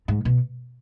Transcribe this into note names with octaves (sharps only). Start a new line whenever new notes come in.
G#2
B2